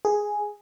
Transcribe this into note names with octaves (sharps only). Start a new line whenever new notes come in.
G#4